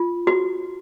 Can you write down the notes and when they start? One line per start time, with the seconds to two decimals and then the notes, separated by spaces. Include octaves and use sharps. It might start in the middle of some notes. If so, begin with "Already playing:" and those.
Already playing: F4
0.27 F#4